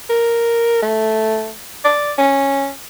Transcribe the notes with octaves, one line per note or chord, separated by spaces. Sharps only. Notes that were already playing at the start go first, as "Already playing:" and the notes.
A#4
A3
D5
C#4